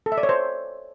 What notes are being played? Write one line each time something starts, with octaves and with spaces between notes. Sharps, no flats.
A4
E5
D5
C#5
C5